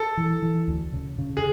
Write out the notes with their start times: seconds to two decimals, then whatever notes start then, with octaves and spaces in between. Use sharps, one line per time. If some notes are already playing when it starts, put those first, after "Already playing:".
Already playing: A4
0.17 E3
0.42 E3
0.68 D2
0.93 C#3
1.18 C#3
1.37 G#4